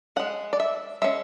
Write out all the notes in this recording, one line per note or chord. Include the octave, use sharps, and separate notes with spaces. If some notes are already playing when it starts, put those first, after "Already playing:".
G#3 C#4 F#5
D5
E5
G#3 C#4 E5